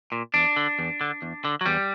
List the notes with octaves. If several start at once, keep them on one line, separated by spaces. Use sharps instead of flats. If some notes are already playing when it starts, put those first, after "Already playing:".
A#2
E2 D4
D3
E2
D3
E2
D3
F#3
E2 G3